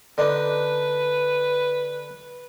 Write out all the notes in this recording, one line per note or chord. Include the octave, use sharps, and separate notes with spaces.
D3 D4 D#4 B4